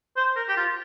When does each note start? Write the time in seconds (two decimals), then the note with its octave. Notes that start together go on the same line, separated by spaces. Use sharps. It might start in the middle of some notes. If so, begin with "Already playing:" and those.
0.17 C5
0.36 A#4
0.48 G4
0.57 F4